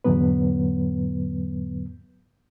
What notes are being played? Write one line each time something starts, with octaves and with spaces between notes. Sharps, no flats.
E2 G#2 D3 F#3 B3 B4